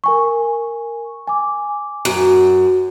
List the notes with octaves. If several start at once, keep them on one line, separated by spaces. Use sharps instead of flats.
A#4 G#5 C#6
G#5 D6
F#2